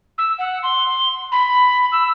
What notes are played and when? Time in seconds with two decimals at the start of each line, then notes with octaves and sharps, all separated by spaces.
0.18 E6
0.38 F#5
0.63 C6
1.32 B5
1.92 E6